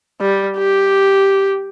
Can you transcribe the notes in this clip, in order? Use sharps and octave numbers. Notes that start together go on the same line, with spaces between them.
G3
G4